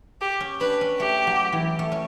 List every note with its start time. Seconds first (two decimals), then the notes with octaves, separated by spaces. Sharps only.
0.21 G4
0.40 C#4
0.61 D4 B4
0.81 C#4
1.00 A3 G4
1.27 F#3
1.53 E3
1.79 A3
1.92 C#4